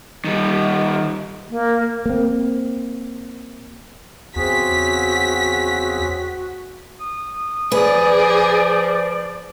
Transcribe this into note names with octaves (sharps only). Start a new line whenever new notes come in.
D#3 G3
A#3
A#3 C4
E2 C#3 C4 F#4 G#4 B6
D#6
F3 G#4 B4 D5